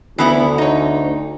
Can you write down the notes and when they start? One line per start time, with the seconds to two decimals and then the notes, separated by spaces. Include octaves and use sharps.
0.18 D2 E3 B3 E4
0.58 D#4 C#5